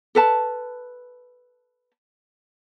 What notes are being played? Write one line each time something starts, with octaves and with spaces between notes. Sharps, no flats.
A4 B4 A5